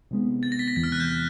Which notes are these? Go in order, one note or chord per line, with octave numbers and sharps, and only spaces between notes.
C3 D#3 G#3 B3
A6
A#6
B6
A#6
E2 C3 E3 A6
F6
F#6
G6